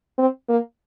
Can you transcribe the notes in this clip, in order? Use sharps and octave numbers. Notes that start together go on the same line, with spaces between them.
C4
A#3